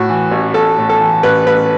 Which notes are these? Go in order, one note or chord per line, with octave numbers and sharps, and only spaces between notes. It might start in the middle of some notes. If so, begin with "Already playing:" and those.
Already playing: A2 F#4
E3
A1
A1 A4
A2
A4
E3
A1 B4
A1 B4